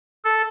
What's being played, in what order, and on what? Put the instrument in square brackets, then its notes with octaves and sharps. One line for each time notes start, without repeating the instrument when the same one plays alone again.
[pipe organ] A4